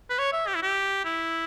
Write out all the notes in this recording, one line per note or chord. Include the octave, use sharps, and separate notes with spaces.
B4
C#5
E5
G4
E4
G4
E4